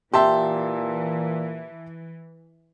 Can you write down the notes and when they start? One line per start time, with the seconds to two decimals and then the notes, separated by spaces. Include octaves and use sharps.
0.14 A#2 E3 G4 E5 A5 C6